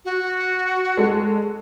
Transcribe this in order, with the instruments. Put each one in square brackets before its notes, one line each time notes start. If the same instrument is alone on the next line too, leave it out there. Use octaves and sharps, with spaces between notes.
[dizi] F#4
[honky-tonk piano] G#3 A4